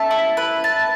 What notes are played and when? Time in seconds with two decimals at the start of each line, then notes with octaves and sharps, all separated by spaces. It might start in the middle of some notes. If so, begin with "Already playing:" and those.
Already playing: E5 A5
0.11 E4
0.37 B4
0.64 A5